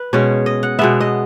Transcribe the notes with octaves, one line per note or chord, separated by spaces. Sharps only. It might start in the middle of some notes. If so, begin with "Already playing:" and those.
Already playing: B4
B2 G#3 C#4 C#5
D#5
F#5
B2 G#3 B3 E5
D#5